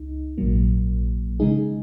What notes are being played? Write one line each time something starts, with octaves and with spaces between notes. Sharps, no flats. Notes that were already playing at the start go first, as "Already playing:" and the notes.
Already playing: C#2 D#4
A#1 G#2 F#3 A#3
C#3 G#3 D#4 G#4